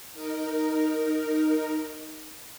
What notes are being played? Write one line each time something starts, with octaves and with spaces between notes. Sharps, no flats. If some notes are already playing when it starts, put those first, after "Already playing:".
D#4 A#4